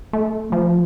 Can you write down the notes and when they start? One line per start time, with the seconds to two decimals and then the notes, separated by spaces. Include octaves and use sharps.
0.13 A3
0.52 F3